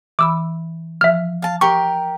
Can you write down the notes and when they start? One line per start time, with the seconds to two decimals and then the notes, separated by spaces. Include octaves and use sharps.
0.19 E3 B5 D6 E6
1.01 F3 E5 F6
1.42 F5 A5
1.61 G4 A#4 C#6